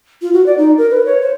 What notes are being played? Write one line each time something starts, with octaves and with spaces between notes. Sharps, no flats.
F4
F#4
D5
D#4
A#4
B4
C#5
C5